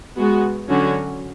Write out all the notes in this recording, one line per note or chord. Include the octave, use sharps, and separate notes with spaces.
G#3 B3 F#4
D3 F#3 C#4 F#4